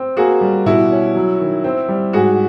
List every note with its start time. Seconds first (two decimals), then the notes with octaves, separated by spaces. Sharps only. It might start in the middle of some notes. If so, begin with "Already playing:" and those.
Already playing: C4
0.17 A#3 F#4 G#4
0.41 G3
0.66 B2 E4 F#4
0.91 C#4
1.15 F#3
1.40 D#3
1.64 C4
1.88 G3
2.13 G#2 F#4 G#4